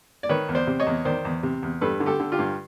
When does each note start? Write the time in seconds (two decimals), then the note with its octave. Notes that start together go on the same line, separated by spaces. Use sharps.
0.23 D5
0.29 D#3 B4 C#5
0.49 E2
0.55 C5 D5
0.67 C3
0.80 C#5 D#5
0.87 E2
1.05 D#3 C5 D5
1.25 E2
1.43 C3
1.63 E2
1.81 G2 A4 B4
2.00 D3
2.06 G4 A4
2.20 D3
2.32 F4 G4
2.38 G2